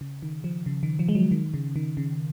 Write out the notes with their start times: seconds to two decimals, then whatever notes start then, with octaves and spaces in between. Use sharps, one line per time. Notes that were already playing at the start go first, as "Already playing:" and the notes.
0.01 C#3
0.22 D#3
0.44 F3
0.66 C#3
0.83 D#3
0.99 F3
1.08 G#3
1.15 F#3
1.31 D#3
1.54 C#3
1.76 D#3
1.97 C#3